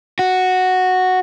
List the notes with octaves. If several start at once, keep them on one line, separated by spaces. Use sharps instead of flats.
F#4